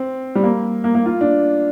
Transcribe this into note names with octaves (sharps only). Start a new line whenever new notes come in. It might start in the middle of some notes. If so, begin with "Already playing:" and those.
Already playing: C4
G3
A#3
A#3
A#3
F4
D4